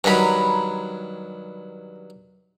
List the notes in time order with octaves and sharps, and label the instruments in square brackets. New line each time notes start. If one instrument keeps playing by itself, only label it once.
[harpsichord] G2 D#3 F#3 [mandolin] A#5 B5